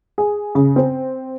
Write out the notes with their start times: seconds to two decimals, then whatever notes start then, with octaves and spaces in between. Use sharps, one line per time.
0.18 G#4
0.55 C#3
0.76 C4